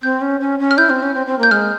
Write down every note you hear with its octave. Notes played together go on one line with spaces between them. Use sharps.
C4 G6
C#4
C#4
C#4
F6
E4 G6
C4
C#4
C4
C4
A#3 G6
G#3 F6